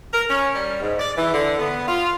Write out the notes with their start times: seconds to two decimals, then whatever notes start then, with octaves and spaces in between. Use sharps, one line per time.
0.14 A#4
0.29 C#4
0.55 G3
0.82 G#2
0.99 D5
1.17 E3
1.33 D3
1.58 B3
1.87 F4